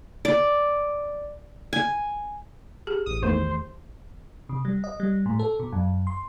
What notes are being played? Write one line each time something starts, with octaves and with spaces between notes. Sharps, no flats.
D5
G#5
G4 G#4
A1 D#6
E2 D#3 A3 C5
C3
G3
D#5
G3
A2
A4
B2
F#2
C6